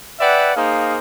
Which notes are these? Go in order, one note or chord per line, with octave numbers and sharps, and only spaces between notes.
B4 D5 E5 F#5 G5
A#3 D#4 G#4 C5 F5